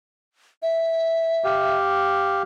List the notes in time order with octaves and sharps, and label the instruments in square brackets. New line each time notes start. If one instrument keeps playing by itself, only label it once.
[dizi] E5
[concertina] G4 F5